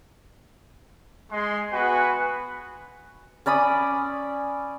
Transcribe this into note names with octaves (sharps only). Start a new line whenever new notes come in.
G#3 C6
B3 F#4 B4 G#5
C#4 D5 B5 D#6